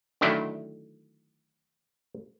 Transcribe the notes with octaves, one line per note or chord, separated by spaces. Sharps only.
D3 D#3 F#3 A3 E4 G5